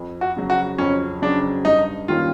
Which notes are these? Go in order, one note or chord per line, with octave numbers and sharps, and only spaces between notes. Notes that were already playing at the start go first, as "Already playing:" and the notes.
Already playing: F2
F#4
C#3 F#3
F#4
F2 C#4
C#3 F#3 D4
G2 D#4
D#3 G3 A#3 C#4 F4